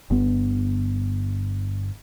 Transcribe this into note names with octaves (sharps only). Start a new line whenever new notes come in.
G1 B3